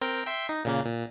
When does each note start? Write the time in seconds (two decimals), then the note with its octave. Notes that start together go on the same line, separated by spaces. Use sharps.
0.02 C4 A#4 G5
0.27 E5 G5 C6
0.49 D#4
0.65 A#2 C#3 A#3
0.85 A#2